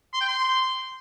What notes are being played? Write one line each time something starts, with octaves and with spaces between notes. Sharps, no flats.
C6
G5
C6